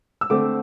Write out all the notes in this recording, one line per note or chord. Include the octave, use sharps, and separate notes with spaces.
E6
D3 A3 C4 D6